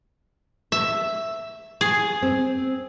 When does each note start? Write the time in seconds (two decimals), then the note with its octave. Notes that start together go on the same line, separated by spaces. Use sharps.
0.72 E5
1.81 G#4
2.22 C4